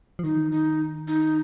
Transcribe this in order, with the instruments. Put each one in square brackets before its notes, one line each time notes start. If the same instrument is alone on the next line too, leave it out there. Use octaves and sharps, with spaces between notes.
[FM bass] F3
[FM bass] D#3 [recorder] D#4
[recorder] D#4
D#4